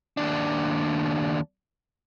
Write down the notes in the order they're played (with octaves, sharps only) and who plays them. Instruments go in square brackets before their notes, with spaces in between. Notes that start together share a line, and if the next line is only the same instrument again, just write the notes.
[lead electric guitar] D#2 D4